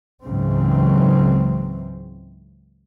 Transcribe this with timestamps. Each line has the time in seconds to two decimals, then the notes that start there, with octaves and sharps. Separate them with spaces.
0.23 C#2 G#2 C#3 E3 F#3 C4